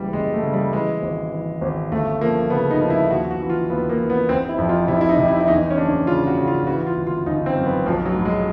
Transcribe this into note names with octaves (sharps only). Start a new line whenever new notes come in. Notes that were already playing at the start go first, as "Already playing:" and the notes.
Already playing: F#1 E3 G3
F#1 G#3
A3
C#3
G3
E3 G#3
G#1
E3
G#1
G1 A3
F3 A#3
C#3 B3
D#4
F3
E4
D#2 F#4
F#4
E3
F4
D#2 B3
A#3
E3
B3
F1 C4
E4
F2
F4
C3 E4
E4
D#4
C3
E4
E4
E2 D#4
C#4
F#1 D4
C#3 F4
F#4
C#3
F4
E3 F#4
F4
G1
F4
G1 D#4
C4
F#2
B3
B1 F3
F#3
A2
G#3